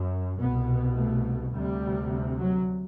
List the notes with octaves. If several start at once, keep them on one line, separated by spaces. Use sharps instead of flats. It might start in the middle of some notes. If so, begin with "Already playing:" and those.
Already playing: F#2
C2 B2 B3
A3
D2 C3 G3
F#3